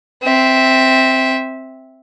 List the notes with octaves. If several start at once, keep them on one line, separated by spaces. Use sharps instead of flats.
C4 E5